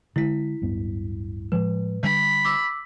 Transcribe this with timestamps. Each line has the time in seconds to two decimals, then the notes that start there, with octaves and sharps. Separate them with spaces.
0.16 D3 G#3 E4 B6
0.61 D1 G2 B3
1.52 A2 F3 G#3 B4
2.03 D3 G3 D4 B5
2.45 D6 E6